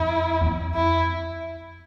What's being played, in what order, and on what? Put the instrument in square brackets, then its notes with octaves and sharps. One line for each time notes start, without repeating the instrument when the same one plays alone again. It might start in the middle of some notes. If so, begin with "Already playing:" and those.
Already playing: [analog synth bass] F2 [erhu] E4
[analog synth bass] E2
F2
[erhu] E4